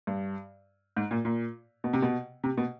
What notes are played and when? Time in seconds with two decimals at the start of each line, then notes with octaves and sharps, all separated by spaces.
0.07 G2
0.97 G#2
1.11 A#2
1.25 A#2
1.84 B2
1.93 C3
2.02 B2
2.44 C3
2.57 B2